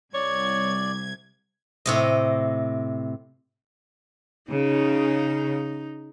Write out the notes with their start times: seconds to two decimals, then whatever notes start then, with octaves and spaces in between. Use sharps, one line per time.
0.14 C2 C#5 D5 G#6
1.86 A2 C3 D#5
4.51 C#3 D#4